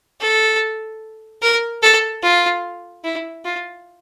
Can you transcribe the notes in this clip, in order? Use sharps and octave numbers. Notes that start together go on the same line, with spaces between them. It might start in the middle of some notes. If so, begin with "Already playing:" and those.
A4
A#4
A4
F4
E4
F4